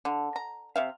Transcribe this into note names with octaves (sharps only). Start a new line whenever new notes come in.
D3
A#5
C3 E5 F5